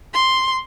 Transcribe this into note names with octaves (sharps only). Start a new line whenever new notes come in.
C6